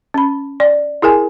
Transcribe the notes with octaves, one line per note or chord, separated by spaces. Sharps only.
C#4 B5
D5
E4 G#4 A#4 G#5